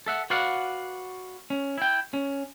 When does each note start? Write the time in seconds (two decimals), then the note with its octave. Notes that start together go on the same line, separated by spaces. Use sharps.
0.06 A4 E5 F#5
0.30 F#4 B4 D5 F5 F#5
1.50 C#4
1.78 E4 G5
2.14 C#4